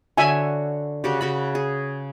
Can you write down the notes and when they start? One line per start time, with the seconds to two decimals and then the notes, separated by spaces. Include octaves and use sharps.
0.17 D3 F#4 C#5 E5 G#5
1.04 C#3 F#4 G4
1.21 C#3 F#4 B5
1.55 G#4